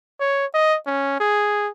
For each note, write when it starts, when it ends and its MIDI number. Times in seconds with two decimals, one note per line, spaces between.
0.20 0.46 73
0.54 0.77 75
0.87 1.16 61
1.20 1.69 68